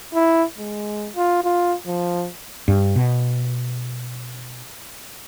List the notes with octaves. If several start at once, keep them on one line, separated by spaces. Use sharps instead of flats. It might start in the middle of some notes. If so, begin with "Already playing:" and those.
E4
G#3
F4
F4
F3
G2
B2